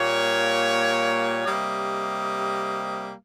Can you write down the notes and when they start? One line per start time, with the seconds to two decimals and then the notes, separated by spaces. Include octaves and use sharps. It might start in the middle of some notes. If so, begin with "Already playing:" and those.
Already playing: A#2 G3 A#3 C#5
1.45 C3 G3 A#3 D#5